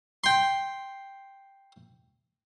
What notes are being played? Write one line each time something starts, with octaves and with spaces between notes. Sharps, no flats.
G5 C6